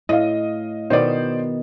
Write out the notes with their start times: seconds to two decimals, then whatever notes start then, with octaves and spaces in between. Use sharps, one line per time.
0.09 A2 D#5 F5
0.90 B2 D#3 B3 C5 D5